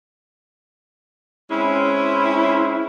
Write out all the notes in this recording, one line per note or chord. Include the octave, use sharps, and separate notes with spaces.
G#3 C4 C#4 E4